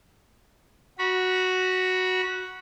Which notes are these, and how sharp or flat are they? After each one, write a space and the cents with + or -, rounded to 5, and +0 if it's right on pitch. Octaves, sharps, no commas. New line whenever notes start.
F#4 +0 B5 -30